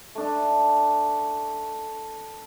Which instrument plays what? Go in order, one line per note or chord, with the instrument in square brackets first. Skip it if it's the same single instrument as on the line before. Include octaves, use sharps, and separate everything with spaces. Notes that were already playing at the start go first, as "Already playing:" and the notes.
[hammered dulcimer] A3 D4